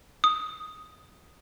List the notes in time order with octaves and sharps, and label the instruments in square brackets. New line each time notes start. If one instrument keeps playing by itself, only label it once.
[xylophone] D#6